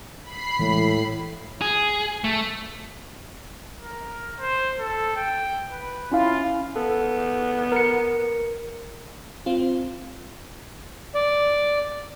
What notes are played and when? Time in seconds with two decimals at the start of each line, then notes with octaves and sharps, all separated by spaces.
0.23 B5 C7
0.59 A2 E3 F#3 G#3
1.61 G#4
2.24 A3
3.81 A#4
4.40 C5
4.79 A4
5.16 G5
5.72 B4
6.12 C#4 E4 F4 F5
6.76 B3 A4
7.72 A#4 C#7
9.46 C4 F4
11.15 D5